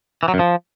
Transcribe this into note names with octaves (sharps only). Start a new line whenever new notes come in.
E3
F#3
F#2
F3